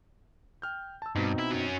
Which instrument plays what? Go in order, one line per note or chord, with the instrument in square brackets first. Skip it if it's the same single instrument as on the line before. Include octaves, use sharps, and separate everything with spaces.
[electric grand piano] G5 F6 G6
A5 E6
[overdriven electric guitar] G2 [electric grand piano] B2 C4 D#4
[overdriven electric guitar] E4
F#3 C#4